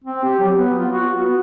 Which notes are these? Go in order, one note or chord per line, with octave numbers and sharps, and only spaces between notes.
C4
G4
F#3
B3
F4
F#4
B3